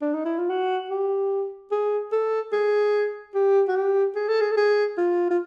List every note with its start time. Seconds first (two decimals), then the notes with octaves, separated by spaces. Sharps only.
0.02 D4
0.14 D#4
0.25 E4
0.38 F4
0.50 F#4
0.90 G4
1.72 G#4
2.12 A4
2.53 G#4
3.35 G4
3.68 F#4
3.76 G4
4.15 G#4
4.28 A4
4.41 G#4
4.51 A4
4.57 G#4
4.98 F4
5.30 F4